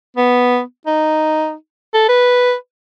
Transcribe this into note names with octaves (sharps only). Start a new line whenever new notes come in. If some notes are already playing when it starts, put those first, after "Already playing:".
B3
D#4
A4
B4